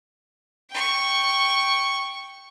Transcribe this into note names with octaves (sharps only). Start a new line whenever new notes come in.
G5 C#6